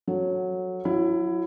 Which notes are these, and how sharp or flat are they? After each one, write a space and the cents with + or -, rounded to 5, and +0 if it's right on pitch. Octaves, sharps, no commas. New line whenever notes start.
F#3 -10 A4 +0
F#3 -15 E4 +20